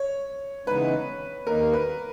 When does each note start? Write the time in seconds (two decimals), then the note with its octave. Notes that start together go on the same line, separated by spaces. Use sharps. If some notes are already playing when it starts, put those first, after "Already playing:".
Already playing: C#5
0.66 C#3 E3 G#3 B3 D#4 B4
1.47 D#2 D#3 A#3 D#4 A#4
1.73 B4